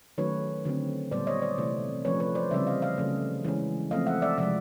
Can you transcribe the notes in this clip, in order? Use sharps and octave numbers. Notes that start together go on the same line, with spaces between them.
D#3 F#3 A3 C#4 B4 C#5
D3 F#3 A3 C4
A#2 G3 B3 C5 D5
C#5 D#5
C5 D5
C3 E3 A3
F3 A3 C#4 B4 C#5
B4 C#5
C5 D5
C#3 E3 G3 C4 D5 E5
D#5 F5
D#5 F5
C#3 F#3 A3 C#4
E3 G#3 C#4
F3 A3 C4 D#5 F5
E5 F#5
D5 E5
C3 F3 G#3 D5 E5